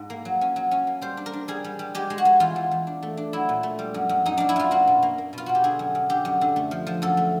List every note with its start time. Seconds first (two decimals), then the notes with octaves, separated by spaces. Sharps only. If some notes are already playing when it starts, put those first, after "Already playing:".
Already playing: G#2
0.10 A#3
0.25 F#3
0.41 C#4
0.56 F#3
0.71 C#4
0.87 A#3
1.01 G3 C5
1.17 D4
1.26 A#4
1.33 D4
1.48 G3 G#4
1.64 G3
1.79 G3
1.95 G#3 G4
2.10 G#3
2.18 F#4
2.25 G#3
2.40 E2 F4
2.56 E2
2.71 E2
2.87 D4
3.03 A3
3.17 D4
3.33 F#3 E4
3.49 A#2
3.63 A3
3.79 G3
3.94 F#2
4.09 F#2
4.26 F#2 D#4
4.37 F#2 D4
4.49 E4
4.56 F#2 F4
4.71 A#3 F#4
4.87 B2
5.03 A#3
5.18 A#3
5.33 B2 F4
5.46 B2 F#4
5.55 G4
5.64 D3 G#4
5.79 F#2
5.95 F#2
6.09 D3 G4
6.25 F#2
6.41 D3
6.56 A3
6.71 F3
6.87 F3
7.02 F#2 A4
7.17 A3